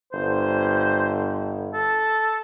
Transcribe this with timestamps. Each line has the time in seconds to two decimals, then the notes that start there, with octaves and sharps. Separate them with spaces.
0.13 G1 C5
1.73 A4